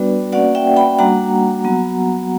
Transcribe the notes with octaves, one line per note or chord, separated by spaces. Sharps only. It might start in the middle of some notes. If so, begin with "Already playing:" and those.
Already playing: G3 B3 D4 F#4 B4 D5
A#3 C#4 F#4 D5 F#5
E5 G5
G5 B5
G3 A#3 D4 F#4 F#5 A#5
F#3 B3 F#4